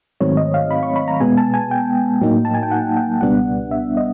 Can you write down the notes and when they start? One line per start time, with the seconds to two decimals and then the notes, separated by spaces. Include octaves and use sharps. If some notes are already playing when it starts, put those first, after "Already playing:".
0.21 G#2 D#3 F#3 A3 C4 C#5
0.37 D#5
0.54 F5
0.71 B5
0.83 C#6
0.96 B5
1.08 A#5
1.20 B2 G#3 B3 G#5
1.37 A5
1.54 G#5
1.71 G5
2.21 A2 F#3 A#3 D#4
2.45 A5
2.54 G#5
2.63 G5
2.71 F#5
2.97 G5
3.21 C#2 B2 G3 B3 D4 F#5
3.71 E5
3.97 D#5